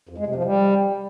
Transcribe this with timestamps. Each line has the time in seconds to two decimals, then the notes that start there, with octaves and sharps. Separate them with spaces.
0.09 F2
0.18 G#3
0.27 C3
0.35 F3
0.44 G3